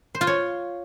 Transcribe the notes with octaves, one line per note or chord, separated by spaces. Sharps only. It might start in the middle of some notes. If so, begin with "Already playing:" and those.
C5
F4
C#5